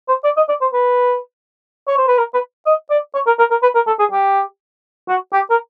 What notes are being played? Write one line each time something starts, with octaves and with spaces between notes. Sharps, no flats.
C5
D5
D#5
D5
C5
B4
C#5
C5
B4
A#4
B4
D#5
D5
C#5
A#4
A#4
A#4
B4
A#4
A4
G#4
G4
F#4
G4
A#4